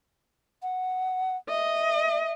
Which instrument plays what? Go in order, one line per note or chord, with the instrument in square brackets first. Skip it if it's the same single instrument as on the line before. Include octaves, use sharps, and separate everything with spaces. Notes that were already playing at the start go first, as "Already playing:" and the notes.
[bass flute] F#5
[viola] D#5 [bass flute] E5